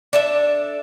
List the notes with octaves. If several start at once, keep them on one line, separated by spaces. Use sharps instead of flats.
D4 A4 E5